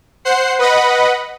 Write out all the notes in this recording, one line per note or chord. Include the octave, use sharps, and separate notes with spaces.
C5 F#5 C7
B4 D#5 F#5 B5